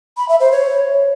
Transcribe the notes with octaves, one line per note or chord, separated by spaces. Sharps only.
B5
E5
C5
C#5